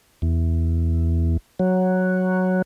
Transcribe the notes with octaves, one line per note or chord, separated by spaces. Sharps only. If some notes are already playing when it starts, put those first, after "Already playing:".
E2
F#3